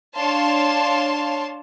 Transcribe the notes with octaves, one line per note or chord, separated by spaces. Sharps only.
D4 C#5 F5 A5 C6